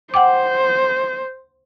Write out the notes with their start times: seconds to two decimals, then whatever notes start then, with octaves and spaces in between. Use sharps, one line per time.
0.14 C5 F#5 G5 D6